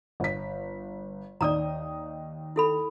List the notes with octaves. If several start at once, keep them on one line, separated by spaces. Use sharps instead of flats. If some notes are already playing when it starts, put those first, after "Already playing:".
G1 B6
D#2 D#4 D5 A#5 D#6
E4 A4 B5